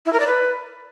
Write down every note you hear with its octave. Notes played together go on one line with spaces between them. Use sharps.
E4
A#4
D5
B4